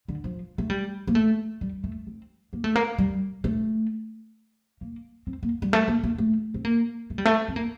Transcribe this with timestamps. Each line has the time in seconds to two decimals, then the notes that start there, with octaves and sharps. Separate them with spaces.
0.08 D3
0.24 F3
0.58 A3
0.70 G3
1.07 A#3
1.15 A3
1.61 G3
1.84 A3
2.07 C4
2.53 A#3
2.64 A3
2.76 A#3
2.98 G3
3.44 A3
4.81 A#3
5.27 C4
5.43 A#3
5.62 G3
5.73 A3
5.88 A#3
6.04 A#3
6.18 A3
6.54 C4
6.65 A#3
7.10 A3
7.18 G3
7.25 A3
7.48 C4
7.56 A#3